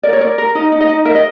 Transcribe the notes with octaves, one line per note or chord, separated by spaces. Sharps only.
A#4 D5
C#5
A#4 D5
A#4
D#4 D#5
D#4
D#5
D#4
A#4 E5
D#5